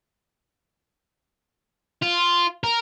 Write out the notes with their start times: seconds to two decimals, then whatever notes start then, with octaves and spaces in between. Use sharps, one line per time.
2.03 F4
2.64 A#4